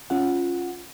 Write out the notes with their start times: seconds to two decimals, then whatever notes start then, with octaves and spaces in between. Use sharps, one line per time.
0.10 C#4 F4 F#5